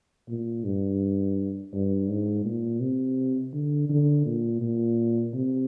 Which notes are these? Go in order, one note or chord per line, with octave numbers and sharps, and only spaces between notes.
A#2
G2
G2
G#2
A#2
C3
D3
D3
A#2
A#2
C3